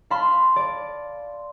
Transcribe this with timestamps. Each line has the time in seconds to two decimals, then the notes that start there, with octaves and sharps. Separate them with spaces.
0.10 F5 A5 B5 C6
0.56 D5